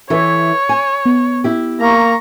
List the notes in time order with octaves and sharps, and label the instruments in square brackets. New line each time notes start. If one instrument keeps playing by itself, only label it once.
[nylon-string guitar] E3 A4 E5 [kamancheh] C#5
[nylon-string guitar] G#5
[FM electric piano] B3
[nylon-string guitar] E4 G4
[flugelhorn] A#3 [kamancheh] A#5 C#6